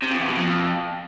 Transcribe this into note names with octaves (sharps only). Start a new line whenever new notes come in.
C3
F2
E2
B2
F2